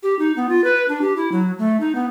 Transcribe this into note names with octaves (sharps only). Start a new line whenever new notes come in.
G4
D#4
B3
F4
B4
D4
G4
E4
F#3
A3
D#4
B3